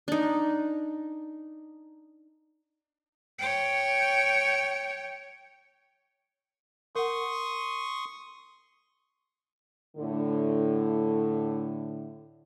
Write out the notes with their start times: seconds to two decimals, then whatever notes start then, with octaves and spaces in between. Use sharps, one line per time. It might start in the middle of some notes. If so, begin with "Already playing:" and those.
0.08 D4 D#4
3.38 C#5 G5
6.95 A#4 F#5 C6 C#6 D#6
9.97 A2 D3